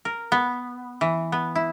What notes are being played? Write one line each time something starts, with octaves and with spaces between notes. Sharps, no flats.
A#4
B3
E3
B3
E4